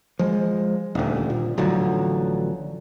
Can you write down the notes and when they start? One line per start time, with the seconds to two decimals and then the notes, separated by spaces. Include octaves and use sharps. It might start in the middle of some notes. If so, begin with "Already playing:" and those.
0.19 F3 G#3
0.95 D#1 D2
1.30 A#2
1.58 A1 D3 F3 F#3